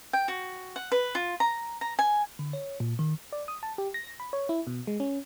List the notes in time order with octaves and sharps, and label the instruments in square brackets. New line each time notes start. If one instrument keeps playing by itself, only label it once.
[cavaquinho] G5
F#4
F#5
B4
F4
A#5
A#5
G#5
[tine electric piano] D3
C#5
A#2
D#3
[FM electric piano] D5
D#6
A5
G4
A#6
B5
C#5
E4
B2
G#3
C#4